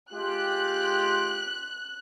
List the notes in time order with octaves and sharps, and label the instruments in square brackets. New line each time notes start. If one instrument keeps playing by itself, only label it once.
[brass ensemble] G#3 F4 G4 [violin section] F#6